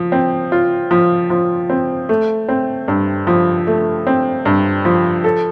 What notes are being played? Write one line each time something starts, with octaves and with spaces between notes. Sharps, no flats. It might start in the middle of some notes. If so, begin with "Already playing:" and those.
Already playing: F3
C4
F4
F3
F3
C4
A3
C4
G2
F3
A3
C4
G2
F3
A4